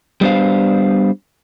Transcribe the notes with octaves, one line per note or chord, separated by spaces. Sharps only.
G3 B3 D4 C5 F5